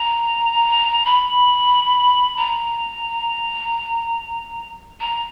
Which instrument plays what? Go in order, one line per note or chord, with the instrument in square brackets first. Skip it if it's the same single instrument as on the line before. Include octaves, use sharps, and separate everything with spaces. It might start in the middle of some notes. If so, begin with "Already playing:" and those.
Already playing: [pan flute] A#5
B5
A#5
A#5